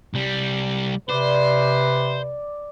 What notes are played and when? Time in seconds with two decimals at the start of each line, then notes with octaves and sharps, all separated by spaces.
0.14 C2 G3
1.09 C3 B4 C5 D5